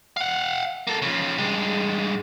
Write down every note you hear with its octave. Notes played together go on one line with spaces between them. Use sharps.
F5 F#5
A#3 A4
C#3 F3
G2 G#3